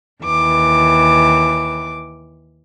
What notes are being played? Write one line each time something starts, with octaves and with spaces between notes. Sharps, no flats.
D#2 E3 D6